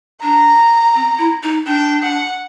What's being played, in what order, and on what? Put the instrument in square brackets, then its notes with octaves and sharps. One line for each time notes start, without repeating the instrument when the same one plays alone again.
[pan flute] D4 [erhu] A#5
[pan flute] C4
E4
D#4
[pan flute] D4 [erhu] G5
[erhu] F#5